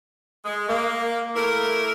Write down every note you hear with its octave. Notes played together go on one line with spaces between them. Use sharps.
G#3
A#3
A3 A#3 E4 A#4